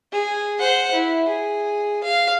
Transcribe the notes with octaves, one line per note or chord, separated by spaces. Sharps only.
G#4
C5 F#5
E4
G#4
F5